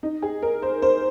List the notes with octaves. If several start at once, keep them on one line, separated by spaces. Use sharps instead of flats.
D#4
G#4
A#4
C5
C5